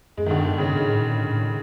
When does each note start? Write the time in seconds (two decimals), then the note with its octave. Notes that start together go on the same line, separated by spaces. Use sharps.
0.17 F#2 G#3
0.26 D#3
0.31 D3
0.44 G2 D#3
0.58 C#3
0.72 G#2
0.86 A2
1.00 A#2
1.13 A2
1.26 A2